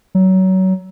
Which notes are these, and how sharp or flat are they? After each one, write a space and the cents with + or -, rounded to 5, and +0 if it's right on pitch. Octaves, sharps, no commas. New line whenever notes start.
F#3 +25